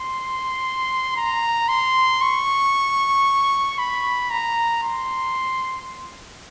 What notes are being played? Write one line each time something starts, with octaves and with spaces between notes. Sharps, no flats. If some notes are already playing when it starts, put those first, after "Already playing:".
Already playing: C6
A#5
C6
C#6
B5
A#5
C6